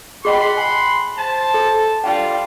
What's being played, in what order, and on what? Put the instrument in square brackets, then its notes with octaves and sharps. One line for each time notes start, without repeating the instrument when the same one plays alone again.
[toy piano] G#4 D#5 G5 [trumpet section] F#5 B5 C6
[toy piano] G#5
[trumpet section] C5 A5
[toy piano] A4
[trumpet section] G3 D4 F4 [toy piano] F5 G5